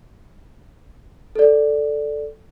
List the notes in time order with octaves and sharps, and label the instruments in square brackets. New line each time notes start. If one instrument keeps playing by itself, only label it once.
[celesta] A4 D5